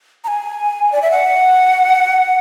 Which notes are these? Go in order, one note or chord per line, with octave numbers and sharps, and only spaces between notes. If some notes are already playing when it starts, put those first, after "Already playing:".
A#5
G#5
D5
E5
F#5